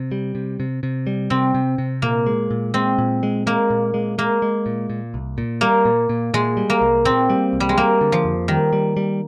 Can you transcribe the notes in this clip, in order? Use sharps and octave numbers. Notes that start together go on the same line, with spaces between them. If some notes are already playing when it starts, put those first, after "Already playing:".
Already playing: C3
G3
C3
C3
C3
G3
C3 C4
C3
C3
A#2 A#3
G#3
A#2
G#3 C4
A#2
G#3
G#3 A#3
A#2
G#3
G#3 A#3
G#3
A#2
A#2
C2
A#2
G3 A#3
A#2
A#2
A#2 G#3
G3
A#3
C2
A#2 C4
G3
C2
G3
G#3
G3 A#3
D3
F3
F2
D#3 G3
G3
G3